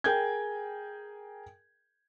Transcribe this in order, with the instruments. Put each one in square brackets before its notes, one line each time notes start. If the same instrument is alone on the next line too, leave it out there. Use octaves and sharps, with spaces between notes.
[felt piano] G#4 A#4 G5 G#5 G6 G#6